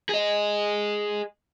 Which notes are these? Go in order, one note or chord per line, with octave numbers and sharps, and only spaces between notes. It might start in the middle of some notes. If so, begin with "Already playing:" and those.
G#4 D#5